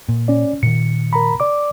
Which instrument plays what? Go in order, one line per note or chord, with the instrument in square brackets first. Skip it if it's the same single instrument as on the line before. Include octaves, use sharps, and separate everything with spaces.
[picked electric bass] A#2
[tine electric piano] C#4 D5
[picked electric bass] A#2 D#3 [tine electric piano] C#7
[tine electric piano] A#4 A#5 B5
D5 D6